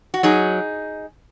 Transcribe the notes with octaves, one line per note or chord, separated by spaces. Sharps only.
F#4
F#3 D#4 G#4